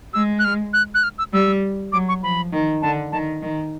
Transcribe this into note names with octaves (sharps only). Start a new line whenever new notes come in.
G#3 E6
F#6
F6
F#6
F#6
F6
E6
G3 E6
F#3 D6
C#6
F3 B5
D#3
D3 A5
D#3 A5
D#3